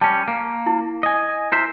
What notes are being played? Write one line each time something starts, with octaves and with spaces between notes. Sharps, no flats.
G3 C#4 A5
A#3
E4
D#5 G#5
E4 A#4 C5 E5